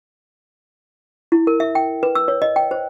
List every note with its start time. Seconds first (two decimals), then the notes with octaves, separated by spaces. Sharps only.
1.32 E4
1.47 A#4
1.60 E5
1.75 G5
2.03 B4
2.15 E6
2.28 C#5
2.42 D#5
2.56 G5
2.71 C5